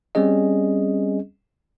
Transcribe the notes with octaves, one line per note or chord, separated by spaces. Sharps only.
G3 C4 C#4 G#4 D#5